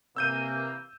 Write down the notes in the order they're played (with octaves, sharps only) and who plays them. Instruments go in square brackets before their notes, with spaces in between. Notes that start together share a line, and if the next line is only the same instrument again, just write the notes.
[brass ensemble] C3 E3 A#3 [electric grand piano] E6 G6 D#7